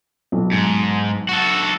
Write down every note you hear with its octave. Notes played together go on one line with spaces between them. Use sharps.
B1
G#2
F#4 A4